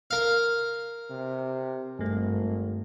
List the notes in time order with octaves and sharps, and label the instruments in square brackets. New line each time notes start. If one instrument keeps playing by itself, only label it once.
[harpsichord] A#4 F5
[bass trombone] C3
[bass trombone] G#1 [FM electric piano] G2 A3